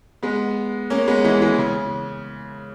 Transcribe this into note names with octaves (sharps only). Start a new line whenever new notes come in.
G#3 B3
A#3 C#4
G#3 B3
E3 G#3
E3 G#3
C#3